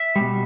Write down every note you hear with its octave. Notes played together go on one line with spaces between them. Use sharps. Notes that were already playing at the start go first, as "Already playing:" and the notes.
Already playing: E5
G3
B2